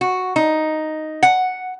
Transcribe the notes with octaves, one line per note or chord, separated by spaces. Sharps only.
F#4
D#4
F#5